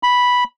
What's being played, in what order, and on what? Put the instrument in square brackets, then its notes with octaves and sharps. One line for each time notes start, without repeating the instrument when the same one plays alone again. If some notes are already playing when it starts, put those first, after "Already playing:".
[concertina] B5